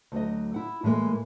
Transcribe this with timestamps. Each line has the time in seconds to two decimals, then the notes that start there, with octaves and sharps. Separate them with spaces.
0.12 D2 F#3 D#5
0.54 E4 F#5
0.83 A2 E3 F3 G#3 A#3